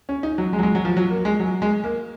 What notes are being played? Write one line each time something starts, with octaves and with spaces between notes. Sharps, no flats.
C#4
D#4
F#3
G#3
F#3
G#3
F#3
F3
F#3
A#3
G#3
F#3
G#3
A#3